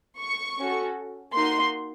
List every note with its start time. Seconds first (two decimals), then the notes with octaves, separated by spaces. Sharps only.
0.19 C#6
0.57 C#4 F#4 A4
1.34 A#3 D#4 F#4 C6